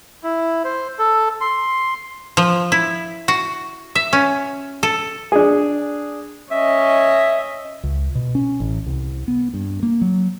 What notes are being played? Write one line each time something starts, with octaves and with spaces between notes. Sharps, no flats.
E4
C5
A4
C6
F3
E4
F#4
E5
C#4
A4
D4 G#4
C#4 D#5 E5
C#2
B2
C#4
A1
C2
B3
G2
A#3
F#3